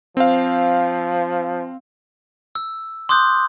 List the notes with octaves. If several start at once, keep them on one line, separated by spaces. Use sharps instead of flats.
F3 C4 F5
E6
C6 D6 D#6 F#6 G6